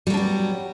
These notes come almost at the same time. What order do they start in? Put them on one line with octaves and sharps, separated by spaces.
G3 F#3 D4 B3